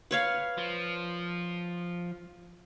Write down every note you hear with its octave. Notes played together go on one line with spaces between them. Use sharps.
B4 C#5 F5
F3